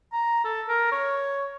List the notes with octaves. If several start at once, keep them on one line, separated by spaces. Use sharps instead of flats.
A#5
A4
A#4
C#5